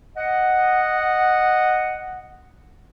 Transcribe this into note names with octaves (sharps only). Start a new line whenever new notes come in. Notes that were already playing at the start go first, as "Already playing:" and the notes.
D#5 F#5